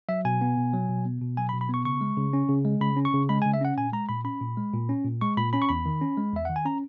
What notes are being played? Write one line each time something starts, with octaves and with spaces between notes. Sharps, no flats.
F#3 E5
B2 G#5
B3
B2
F#3
B2
B3
B2
F#3 G#5
B5
B2
B5
B3 C#6
C#3 C#6
G#3
C#3
C#4
C#3
G#3
C#3 B5
C#4
C#6
C#3
G#3 B5
G#5
C#3
E5
C#4 F#5
A#2 G#5
G#3 A#5
A#2 B5
C#4 B5
A#2
G#3
A#2
C#4
A#2
G#3 C#6
A#2 B5
C#4 B5
C#6
E2 B5
D#3
C#4
G#3
E2 E5
D#3 F#5
G#5
C#4 A#5